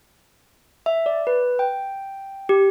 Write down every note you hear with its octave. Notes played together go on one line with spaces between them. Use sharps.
E5
D5
B4
G5
G4